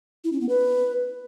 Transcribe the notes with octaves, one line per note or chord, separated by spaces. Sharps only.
E4
C#4
B3
B4